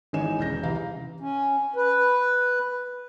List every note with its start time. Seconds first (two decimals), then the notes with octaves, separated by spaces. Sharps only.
0.13 G#1 E3 D#4 C#5 G#5 E7
0.38 E1 C#4 G6 A#6
0.63 C2 E3 F5 A#5
1.20 C#4
1.76 B4